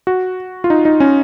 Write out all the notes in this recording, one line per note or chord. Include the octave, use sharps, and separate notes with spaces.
F#4
F4
D#4
D#4
C#4